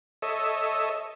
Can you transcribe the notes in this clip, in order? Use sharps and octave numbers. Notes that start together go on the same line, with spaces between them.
A4 C#5 D#5 E5